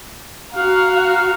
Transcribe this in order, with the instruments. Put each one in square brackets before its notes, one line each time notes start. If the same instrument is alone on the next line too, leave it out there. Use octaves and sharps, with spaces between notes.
[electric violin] F#4 A#5 [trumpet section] F5
[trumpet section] F5